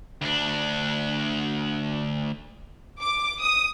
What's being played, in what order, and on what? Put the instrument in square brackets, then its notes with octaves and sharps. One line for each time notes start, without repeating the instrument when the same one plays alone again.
[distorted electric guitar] D2 D4
[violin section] D6
D#6